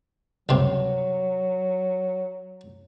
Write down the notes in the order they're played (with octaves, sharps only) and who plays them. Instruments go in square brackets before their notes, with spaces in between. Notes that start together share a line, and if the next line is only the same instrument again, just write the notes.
[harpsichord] C#2 G2 C3 [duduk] F#3